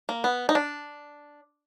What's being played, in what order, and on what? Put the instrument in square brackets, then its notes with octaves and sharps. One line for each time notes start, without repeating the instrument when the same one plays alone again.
[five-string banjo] A#3
B3
D#4
D4